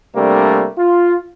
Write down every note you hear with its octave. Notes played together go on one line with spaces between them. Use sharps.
C3 G3 A3 A#3 D4
F4